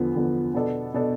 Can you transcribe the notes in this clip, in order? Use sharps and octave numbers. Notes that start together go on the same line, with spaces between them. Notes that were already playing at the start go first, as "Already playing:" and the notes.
Already playing: E2 D3 F3 B3
E2 D3 F3 B3
B2 B3 D4 A4
B2 B3 D4 A4